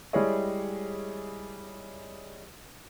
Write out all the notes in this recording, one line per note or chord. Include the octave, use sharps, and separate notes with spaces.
G3 G#3 E4 G#4 C#5 D#5